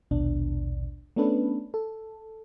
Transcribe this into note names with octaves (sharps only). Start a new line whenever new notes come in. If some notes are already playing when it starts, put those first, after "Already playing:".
A#1 D#2 B2 D4
A3 B3 C#4 D4 A4 B4
A4